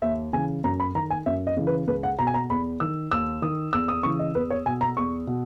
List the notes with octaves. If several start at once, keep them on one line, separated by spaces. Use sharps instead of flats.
D#2 E5
C#3 E3 G#5
F#2 A#5
B5
D#3 A#5
G#5
F#2 E5
D#5
C#3 E3
B4
C#2 B4
F#5
B2 A#5
G#5
A#5
E2 B5
D#3 E6
D#2 E6
D#3 D#6
E2 E6
D#6
C#3 E3 C#6
D#5
E2 B4
C#5
B2 G#5
A#5
E2 C#6
B2